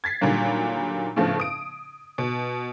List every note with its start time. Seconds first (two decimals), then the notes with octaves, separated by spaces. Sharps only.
0.04 G#6 A6 B6 C7
0.21 A#2 D3 D#3 F#3 G3 A#3
1.16 A2 C#3 F3 A3 B3 D4
1.40 D#6 D7
2.18 B2